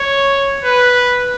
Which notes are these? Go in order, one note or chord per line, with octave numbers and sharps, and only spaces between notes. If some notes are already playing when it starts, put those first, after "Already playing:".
Already playing: C#5
B4